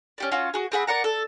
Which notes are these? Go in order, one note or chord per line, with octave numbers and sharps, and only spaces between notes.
C#4 G4 D5
C#4 F4 F#4
F#4 G#4
C4 G#4 F#5 B5
A#4 D5 F#5 A#5
A4